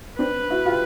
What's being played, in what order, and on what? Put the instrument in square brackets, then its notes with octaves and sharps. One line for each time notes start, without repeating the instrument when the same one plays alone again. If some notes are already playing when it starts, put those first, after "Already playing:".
[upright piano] C4 D4 [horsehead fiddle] B4
[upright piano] E4 F#4
F4 G4